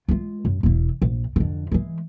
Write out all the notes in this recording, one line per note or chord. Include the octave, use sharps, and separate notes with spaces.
G#3 F4
F#2
E1 E4
A#1
F2 D3
E3 G#3